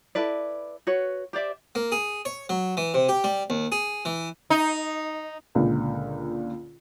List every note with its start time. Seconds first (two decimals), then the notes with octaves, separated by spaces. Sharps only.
0.15 E4 A4 B4 D5
0.87 F#4 B4 C#5
1.33 G4 C5 D5 E5
1.75 A#3
1.92 G#4
2.25 C#5
2.49 F#3
2.77 E3
2.94 C3
3.09 G4
3.24 G3
3.50 D#2
3.72 G#4
4.05 E3
4.50 D#4
5.55 C#2 A#2 D3